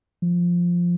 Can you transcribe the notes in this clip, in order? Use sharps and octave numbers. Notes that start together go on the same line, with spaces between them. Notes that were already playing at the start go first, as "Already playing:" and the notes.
F3